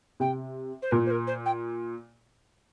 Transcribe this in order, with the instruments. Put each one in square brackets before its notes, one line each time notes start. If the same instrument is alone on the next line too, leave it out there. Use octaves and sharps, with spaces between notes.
[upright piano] C3 [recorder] G5
[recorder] C5
[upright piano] A#2 [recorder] A#4
[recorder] C5
A#4
C5
G5